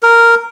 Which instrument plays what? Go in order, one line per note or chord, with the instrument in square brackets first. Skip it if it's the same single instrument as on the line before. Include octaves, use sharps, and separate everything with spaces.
[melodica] A#4